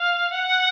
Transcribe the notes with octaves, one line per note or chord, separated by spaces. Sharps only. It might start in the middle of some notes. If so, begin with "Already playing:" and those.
Already playing: F5
F#5